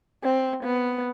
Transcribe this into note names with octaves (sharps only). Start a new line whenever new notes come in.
C4
B3